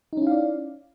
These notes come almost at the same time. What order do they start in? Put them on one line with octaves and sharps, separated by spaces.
D#4 C#4 E4 F5 D5